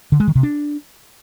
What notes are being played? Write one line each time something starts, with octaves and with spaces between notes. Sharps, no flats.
D3
G#3
D#3
C3
D4